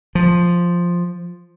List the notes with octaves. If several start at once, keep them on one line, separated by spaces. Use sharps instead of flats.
F3